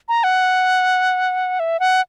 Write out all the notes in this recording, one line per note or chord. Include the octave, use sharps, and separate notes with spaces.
A#5
F#5
E5
F#5